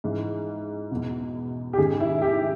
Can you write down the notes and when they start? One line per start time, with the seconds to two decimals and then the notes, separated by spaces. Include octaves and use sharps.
0.04 G#2 E3
0.91 E2 B2
1.73 G4
1.78 G#2 D#3 G#4
2.00 E4
2.22 G4